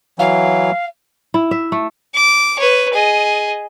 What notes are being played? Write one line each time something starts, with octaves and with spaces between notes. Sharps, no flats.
E3 F#3 F5
E4
E5
A3
D6
B4 C#5
G#4 D#5